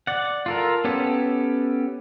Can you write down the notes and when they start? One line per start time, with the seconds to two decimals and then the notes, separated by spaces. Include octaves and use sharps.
0.07 D5 F#5
0.46 F4 A4 A#4
0.84 B3 C#4 G4 A4